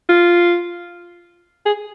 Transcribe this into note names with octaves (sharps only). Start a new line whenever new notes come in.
F4
G#4